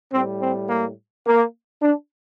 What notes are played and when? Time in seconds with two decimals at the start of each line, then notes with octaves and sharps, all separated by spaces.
0.13 A2 G3 C4
0.41 C4
0.69 A#3
1.26 A#3
1.82 D4